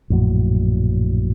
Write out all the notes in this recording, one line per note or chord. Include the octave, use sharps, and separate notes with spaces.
A#1 F#2 A2 F#3